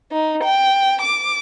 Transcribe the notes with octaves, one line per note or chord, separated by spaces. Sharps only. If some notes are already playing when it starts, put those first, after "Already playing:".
D#4
G5
D6